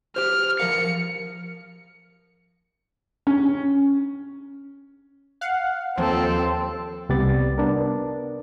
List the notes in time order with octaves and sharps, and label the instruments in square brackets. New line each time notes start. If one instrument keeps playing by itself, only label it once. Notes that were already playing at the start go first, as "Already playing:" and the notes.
[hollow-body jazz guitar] G4 C5 [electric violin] F6
[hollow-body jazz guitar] F3 A#4 F5 [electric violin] C#7
[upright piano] C#4
[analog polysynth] F5 F#5
[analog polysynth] D#2 F3 [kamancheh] C4 A4
[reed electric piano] C2 C3 G3 B3 D5 A6
B3 D4 A#4